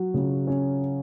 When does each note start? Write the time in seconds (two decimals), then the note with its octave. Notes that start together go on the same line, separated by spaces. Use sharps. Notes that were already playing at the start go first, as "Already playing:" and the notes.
Already playing: F#3 F#4
0.14 C#3
0.47 C#4